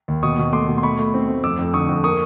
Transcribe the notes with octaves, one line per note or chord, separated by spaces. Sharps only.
D#2
B2 C#6 D#6
B2
A3 C6 D6
B2
C6
A3 B5 C#6
A3
C4
A3
F2 D6 E6
F2
D3 C#6 D#6
F2
A#3 C#6 D#6